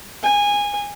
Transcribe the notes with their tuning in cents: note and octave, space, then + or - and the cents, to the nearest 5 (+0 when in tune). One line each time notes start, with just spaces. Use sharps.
G#5 -15